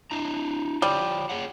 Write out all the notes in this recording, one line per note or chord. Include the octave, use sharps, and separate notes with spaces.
D4 E4 A#5
G3 F4 C5 C#5
G#4 C#5 F#5